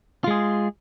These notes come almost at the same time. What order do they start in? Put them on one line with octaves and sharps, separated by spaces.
F4 G#3 G#4